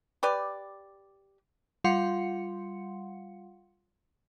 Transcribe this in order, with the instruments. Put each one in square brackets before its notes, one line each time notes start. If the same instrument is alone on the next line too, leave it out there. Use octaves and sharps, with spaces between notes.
[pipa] G4 B4 D5
[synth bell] G3 F4 F5 F#5 C6 C#7